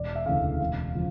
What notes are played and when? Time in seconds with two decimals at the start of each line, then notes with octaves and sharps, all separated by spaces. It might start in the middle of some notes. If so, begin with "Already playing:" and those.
Already playing: E1 D5
0.15 E5
0.26 D2 C#3 E3 A3 F5
0.60 E1 F5
0.95 C#3 F3